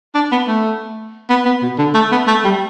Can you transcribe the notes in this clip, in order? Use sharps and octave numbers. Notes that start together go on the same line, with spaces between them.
D4
B3
A3
B3
B3
B2
D3
A3
B3
A3
G3